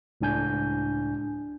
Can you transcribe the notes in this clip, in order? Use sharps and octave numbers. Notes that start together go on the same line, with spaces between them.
C#2 A2 D4 G#5 G6